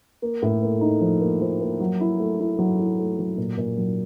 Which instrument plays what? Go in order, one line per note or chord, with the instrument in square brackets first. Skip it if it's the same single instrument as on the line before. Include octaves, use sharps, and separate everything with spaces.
[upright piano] A#3
A2
A#3
D#4
F3
A#3
F3
A#3
F#3
E4
A3
E4
F#3
E4
A3
F#3
A#2
A#2
F#3